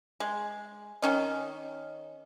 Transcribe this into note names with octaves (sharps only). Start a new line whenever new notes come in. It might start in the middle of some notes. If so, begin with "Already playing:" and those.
G#3
D#3 C#4 D#5